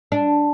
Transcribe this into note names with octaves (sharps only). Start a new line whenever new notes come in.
D4